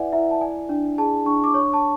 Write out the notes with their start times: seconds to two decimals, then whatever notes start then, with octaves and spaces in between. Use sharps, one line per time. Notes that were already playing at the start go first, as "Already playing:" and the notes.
Already playing: E4 B4 D5 E5 F#5 G#5
0.12 E4 E5
0.31 A5
0.41 D5 G#5
0.69 D4
0.98 G#4 A5
1.26 D4 C#6
1.44 D6
1.54 C#5 C#6
1.73 A5